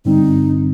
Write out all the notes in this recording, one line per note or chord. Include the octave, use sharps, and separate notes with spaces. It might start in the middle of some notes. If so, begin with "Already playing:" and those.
G2 D3 G3 C4 D#4